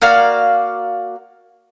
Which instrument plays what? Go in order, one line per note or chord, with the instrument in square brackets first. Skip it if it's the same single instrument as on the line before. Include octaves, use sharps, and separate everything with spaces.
[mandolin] A#3 F#4 D5 F5